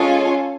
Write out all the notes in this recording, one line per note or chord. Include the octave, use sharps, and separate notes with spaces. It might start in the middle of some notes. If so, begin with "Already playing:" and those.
Already playing: G#3 C#4 F4 A4 C#5 G#5